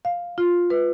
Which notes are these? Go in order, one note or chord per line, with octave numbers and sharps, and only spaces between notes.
F5
F4
B4